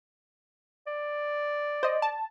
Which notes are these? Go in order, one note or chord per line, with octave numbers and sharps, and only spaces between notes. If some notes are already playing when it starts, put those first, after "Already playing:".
D5
C5 D#5
A5